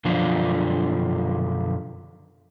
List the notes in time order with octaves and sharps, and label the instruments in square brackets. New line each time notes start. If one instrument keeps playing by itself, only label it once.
[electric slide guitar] F#2 B2 D3 F3 D4 F4